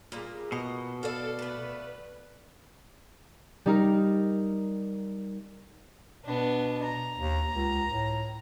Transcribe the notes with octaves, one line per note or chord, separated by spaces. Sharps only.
A#2 G3 A#3 G#4
B2 D#5
A4 D5 F5
A3 B3 B4
G3 D#4 A#4
B2 B3 D4
A#5
D#2
C#2
A2